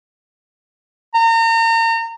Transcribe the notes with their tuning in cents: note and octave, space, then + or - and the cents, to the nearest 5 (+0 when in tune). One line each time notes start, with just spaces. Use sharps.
A#5 -35